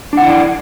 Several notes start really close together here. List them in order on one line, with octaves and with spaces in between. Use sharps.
D4 F#5 E4 D5